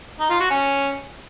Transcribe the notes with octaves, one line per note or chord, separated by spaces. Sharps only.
D#4
F4
F#4
C#4